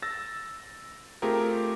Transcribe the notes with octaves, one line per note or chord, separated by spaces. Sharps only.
E6 A6 A#6
A3 C4 F4 G4 G#4 A#4